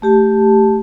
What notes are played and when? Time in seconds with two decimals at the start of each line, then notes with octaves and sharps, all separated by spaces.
0.02 A3 G4 A5